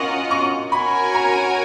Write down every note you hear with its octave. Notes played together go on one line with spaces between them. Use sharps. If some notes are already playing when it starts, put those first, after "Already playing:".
Already playing: C#4 F4 A#4 D#5 F#5 C#6
C#6
F#4 A#4 C#5 G#5 B5
A#5